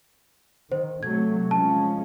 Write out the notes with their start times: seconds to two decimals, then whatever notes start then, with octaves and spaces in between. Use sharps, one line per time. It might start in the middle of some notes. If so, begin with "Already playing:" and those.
0.72 D#3 C5
1.03 C3 F#3 A3 G#6
1.51 F3 G#3 C#4 A5